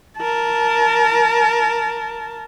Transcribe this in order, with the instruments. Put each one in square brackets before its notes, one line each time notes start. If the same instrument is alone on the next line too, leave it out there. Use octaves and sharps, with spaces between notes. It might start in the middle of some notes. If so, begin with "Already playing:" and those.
[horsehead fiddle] A#4 A5